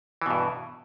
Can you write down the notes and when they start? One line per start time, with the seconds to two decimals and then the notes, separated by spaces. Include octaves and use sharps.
0.22 E3
0.26 B2
0.30 G2